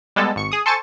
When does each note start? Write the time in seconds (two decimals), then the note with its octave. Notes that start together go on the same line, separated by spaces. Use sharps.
0.16 G3 G#3 B3 A4
0.36 G#1 C#6 C#7
0.52 G#4 D#6
0.66 A4 C5 G#5 C#6 A6